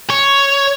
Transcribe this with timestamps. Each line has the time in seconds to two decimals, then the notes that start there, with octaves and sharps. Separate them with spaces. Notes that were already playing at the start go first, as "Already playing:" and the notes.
0.10 C#5